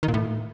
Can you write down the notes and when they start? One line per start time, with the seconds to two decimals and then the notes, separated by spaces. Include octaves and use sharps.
0.03 D#3
0.08 A#2
0.14 A2